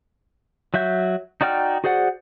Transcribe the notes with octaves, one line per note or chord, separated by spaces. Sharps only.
F#3 F#4 E5 G6
D#4 F#4 D5 G5 F6
F#4 G#4 C5 D5 F#5